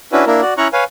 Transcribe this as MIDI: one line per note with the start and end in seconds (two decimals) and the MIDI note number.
0.12 0.25 61
0.12 0.25 62
0.12 0.25 64
0.12 0.25 66
0.12 0.25 71
0.27 0.41 58
0.27 0.41 62
0.27 0.41 64
0.27 0.41 70
0.42 0.54 66
0.42 0.54 74
0.58 0.68 61
0.58 0.68 64
0.58 0.68 73
0.58 0.68 82
0.58 0.68 85
0.58 0.68 90
0.73 0.84 71
0.73 0.84 73
0.73 0.84 77
0.73 0.84 80